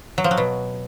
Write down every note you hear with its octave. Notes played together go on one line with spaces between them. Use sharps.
F#3
F3
F#3
B2